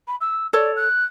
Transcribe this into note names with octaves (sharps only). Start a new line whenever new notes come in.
B5
E6
A4 C#5 D5
F#6